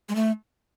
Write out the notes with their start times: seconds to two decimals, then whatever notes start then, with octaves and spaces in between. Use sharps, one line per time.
0.09 G#3
0.15 A3